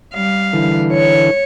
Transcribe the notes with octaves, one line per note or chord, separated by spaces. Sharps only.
G3 F5
D3 E3
C#5